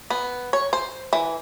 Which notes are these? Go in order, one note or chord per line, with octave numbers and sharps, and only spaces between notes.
B3
C#5
C5
E3